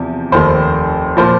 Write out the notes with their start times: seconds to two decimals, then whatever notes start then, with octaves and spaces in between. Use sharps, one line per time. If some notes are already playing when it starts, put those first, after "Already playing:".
Already playing: E2 C3 F3
0.32 F1 D#2 D#3 C5
1.17 A#2 F3 C5